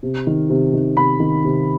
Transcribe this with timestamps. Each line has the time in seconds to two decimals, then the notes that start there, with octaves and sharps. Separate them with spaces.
0.03 C3
0.27 D#3
0.50 C3
0.73 D#3
0.96 C3 B5
1.20 D#3
1.44 C3